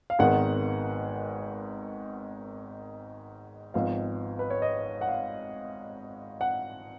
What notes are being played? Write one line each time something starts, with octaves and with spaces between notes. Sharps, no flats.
F5
G#1 G#2 D#3 G#3 B3 F#5
G#1 G#2 F3 B3 F5
B4
C#5
D#5
F#5
F5
F#5